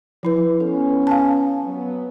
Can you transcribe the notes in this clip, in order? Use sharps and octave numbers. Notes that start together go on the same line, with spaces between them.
F3 E4 B4
B3 C#4 A4
F5 G#5 A5
F#3 B3